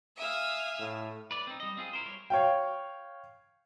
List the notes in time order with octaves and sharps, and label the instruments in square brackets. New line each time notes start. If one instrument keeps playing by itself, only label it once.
[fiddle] E5 [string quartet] F5 G#5 D#6
[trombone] A2
[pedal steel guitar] B4 D5
C4 D#4
G3 D#5
C4 F4 G#4
E4 A#4 C5
G3 A#4 C#5
[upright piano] C#5 F5 G5